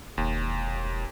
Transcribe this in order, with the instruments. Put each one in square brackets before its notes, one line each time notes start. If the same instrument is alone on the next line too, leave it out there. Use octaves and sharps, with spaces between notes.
[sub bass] E1 [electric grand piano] D#2